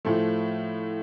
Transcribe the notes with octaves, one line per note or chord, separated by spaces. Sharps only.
A2 F3 A3